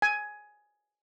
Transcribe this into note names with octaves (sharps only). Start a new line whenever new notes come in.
G#5